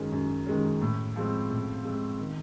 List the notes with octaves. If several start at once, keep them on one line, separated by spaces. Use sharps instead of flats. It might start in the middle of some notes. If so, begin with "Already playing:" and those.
Already playing: F#2 D#3 G#3 C#4
F#2
D#3 G#3 C#4
A2
F3 G#3 C4
A2
F3 G#3 C4
D#3